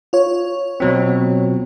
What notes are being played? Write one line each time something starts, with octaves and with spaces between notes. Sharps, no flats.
F4 C#5
B2 F#3 C4